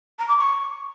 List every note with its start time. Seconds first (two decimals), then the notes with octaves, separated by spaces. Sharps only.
0.19 A#5
0.28 D6
0.37 C#6